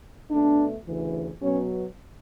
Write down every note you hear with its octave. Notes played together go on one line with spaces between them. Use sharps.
B2 A3 D4
D2 C#3 E3
B2 F#3 B3 C#4